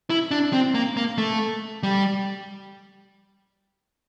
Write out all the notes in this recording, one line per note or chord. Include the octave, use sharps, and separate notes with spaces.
E4
D4
C4
A#3
A#3
A3
G3